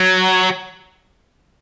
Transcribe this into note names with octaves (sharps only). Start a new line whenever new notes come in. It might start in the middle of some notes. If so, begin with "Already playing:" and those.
Already playing: F#3